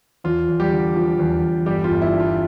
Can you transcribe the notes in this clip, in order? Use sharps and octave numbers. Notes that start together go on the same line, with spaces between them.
E2 F4
E2
G3 G4
D3
F3
E2
E2
G1 G3 G4
F4
G1
E4
G2
F4